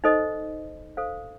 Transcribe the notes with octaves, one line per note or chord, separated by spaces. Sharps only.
D#4 A4 C5 D#5
A4 C5 F5